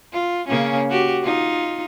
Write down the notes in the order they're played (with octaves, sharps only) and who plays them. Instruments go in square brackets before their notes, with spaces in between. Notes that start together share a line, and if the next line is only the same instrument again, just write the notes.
[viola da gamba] F4
C#3 A#3 C#4
F#4 G4
D#4 F4